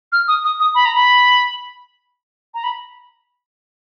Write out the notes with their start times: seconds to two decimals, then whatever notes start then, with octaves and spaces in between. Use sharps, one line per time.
0.12 F6
0.28 D#6
0.44 D#6
0.60 D#6
0.75 B5
0.85 A#5
0.95 B5
2.54 A#5
2.63 B5